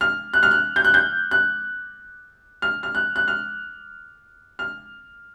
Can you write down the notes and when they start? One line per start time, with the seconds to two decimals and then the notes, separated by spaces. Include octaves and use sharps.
0.01 F6
0.34 F#6
0.43 F6
0.51 F#6
0.76 G6
0.85 F#6
0.94 G6
1.31 F#6
2.62 F6
2.83 F6
2.95 F#6
3.16 F#6
3.28 F6
4.59 F6